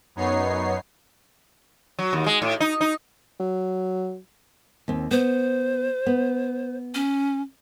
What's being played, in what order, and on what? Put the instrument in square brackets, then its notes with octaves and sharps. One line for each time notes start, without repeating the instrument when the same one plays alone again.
[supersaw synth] F#2 B3 D#4 C#5 C7
[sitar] F#3
D#2
G#3
A2
D#4
D#4
[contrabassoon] F#3
[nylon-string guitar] D#2 C4
[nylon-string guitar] B3 [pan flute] C5
[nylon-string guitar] B3
[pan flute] C#4